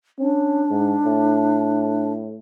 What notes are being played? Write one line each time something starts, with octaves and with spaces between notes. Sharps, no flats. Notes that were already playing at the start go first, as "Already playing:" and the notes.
C#4 D4
G#2
A2